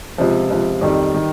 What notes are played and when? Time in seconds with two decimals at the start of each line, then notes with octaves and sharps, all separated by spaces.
0.18 C#2 C3 F3
0.50 C#2 C3 F3
0.81 F2 D#3 G3
1.14 D#3 G3